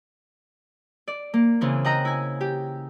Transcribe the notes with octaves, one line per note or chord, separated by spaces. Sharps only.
D5
A#3
C#3 E3 C4
D#5 F#5 G5 A#5 D#6
E4 G#5
G4